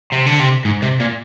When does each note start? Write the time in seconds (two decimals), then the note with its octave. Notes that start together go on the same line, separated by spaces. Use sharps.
0.13 C3
0.26 D3
0.40 C3
0.65 G#2
0.82 C3
1.00 A#2